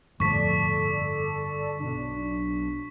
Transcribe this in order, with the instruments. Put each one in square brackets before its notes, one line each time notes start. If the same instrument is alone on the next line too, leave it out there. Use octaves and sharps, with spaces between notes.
[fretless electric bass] G1 [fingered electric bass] F2 A2 F3 [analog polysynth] A4 D5 [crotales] C#6 B6
[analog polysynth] B1 D4